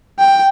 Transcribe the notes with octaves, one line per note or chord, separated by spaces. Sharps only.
G5